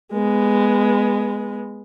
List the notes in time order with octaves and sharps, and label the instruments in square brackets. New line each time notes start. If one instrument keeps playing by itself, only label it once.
[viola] G#3 B3